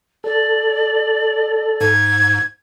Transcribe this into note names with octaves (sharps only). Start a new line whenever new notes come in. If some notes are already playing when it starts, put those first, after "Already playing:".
A4 D5
G#2 G#6